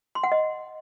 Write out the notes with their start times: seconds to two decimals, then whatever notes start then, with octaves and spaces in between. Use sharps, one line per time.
0.15 C6
0.23 F#5
0.32 D#5